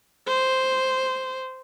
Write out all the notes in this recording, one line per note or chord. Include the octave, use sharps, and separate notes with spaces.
C5